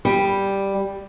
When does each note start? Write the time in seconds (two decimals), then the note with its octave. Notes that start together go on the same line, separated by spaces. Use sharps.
0.05 G3